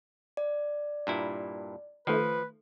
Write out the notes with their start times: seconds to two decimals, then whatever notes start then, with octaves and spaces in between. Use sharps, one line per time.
0.37 D5
1.07 G2 A#2 E4
2.07 D#3 F3 A3 B4